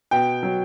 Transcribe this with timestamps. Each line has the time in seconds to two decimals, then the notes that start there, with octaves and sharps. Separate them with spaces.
0.11 B2 G5
0.43 F#3